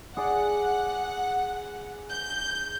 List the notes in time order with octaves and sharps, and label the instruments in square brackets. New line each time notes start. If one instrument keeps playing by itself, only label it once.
[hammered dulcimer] G#4 D5 [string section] F#5
[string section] G6